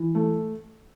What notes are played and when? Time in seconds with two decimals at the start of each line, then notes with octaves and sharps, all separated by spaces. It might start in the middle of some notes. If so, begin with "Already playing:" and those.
Already playing: E3
0.15 A3